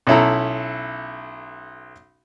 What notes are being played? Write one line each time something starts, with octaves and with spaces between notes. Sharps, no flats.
B1 C#4 E4 A4 A#5